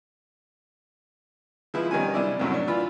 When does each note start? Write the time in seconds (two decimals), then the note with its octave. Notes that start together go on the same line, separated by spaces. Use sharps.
1.74 F3 G#3 E4 B4 E5
1.91 B2 D#3 G3 C#4 G#5
2.14 C2 D4 E4 D5
2.40 C2 F#2 A2 F#3
2.54 D4
2.67 E3 F4 B5